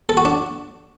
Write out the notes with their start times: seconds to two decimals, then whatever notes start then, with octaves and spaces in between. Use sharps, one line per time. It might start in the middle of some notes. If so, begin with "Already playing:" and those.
0.09 A4
0.17 F#4
0.25 D4